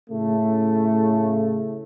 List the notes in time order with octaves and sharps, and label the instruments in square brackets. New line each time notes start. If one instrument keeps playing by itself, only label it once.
[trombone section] A2 C#3 A3